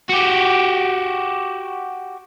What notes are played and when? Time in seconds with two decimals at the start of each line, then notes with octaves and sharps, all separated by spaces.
0.10 F#4 G4